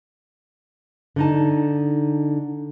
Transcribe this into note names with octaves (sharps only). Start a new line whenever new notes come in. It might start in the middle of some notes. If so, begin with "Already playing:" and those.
D3 D#4 A5